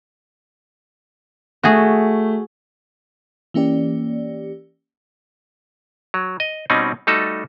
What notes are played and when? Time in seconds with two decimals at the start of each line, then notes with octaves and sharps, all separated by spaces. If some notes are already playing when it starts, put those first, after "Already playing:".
1.63 A3 F#4 G#4
3.54 E3 A#3 C#4 G4 D5
6.14 F#3
6.40 D#5
6.70 B2 G3 C4 C#4 D#4
7.07 G3 A3 D#4 F#4 A4